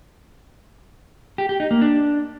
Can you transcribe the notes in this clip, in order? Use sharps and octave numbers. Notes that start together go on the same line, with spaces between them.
G4
G4
D#4
A#3
D4